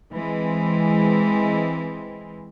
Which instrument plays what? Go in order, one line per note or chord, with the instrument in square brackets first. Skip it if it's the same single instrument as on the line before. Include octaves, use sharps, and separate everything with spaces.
[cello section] E3 G#3 C4